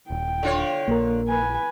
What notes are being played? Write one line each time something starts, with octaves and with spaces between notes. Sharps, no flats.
D#1 G5
D3 F4 C#5
A#1 A#3 A#4
B4 G#5